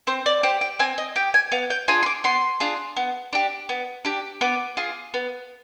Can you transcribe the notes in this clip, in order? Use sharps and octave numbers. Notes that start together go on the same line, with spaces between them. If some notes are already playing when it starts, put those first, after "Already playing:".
C4 C5
D5
G4 C5
G5
C4 G#5
D#5
G4 G5
G#5
B3 F5
G5
D4 F4 G#4 G#5
C6
D6
B3 C6
D4 F4 G#4
B3
D4 G4
B3
D4 G4
B3 D6
F4 G#4
B3